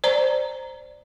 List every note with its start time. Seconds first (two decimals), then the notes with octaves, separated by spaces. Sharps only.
0.04 C5 D5 A#5